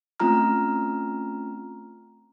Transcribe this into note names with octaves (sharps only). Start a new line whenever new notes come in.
A3 C4 C#4 F4 A#5 F6